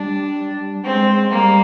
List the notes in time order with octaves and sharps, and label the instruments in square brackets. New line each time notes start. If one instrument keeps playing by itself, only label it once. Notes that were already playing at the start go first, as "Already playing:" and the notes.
Already playing: [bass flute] G3 [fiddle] D4
[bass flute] G#3 [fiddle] C4
[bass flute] G3 [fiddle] A#3